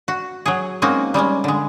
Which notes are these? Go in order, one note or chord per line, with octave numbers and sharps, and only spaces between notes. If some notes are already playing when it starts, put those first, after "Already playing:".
F#4
F#3 G#4
G#3 A#3 C4 C#4 D#4 F#4
G3 G#3 A#3 C#4
D3 G#3